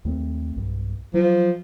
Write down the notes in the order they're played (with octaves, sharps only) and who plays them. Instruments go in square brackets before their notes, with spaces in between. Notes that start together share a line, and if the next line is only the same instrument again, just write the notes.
[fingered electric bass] D#2 A3 C4
B1 G2
[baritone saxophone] F3 [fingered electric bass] F#3